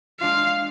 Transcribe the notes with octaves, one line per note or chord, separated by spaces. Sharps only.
G#3 D4 F4 F5